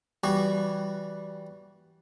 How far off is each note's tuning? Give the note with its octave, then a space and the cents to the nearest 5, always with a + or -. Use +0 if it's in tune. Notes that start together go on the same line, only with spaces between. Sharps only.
E3 +0 G3 -10 F#4 +0